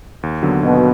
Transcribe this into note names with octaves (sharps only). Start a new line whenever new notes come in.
D#2
D3 F#3 B3
D#2 B2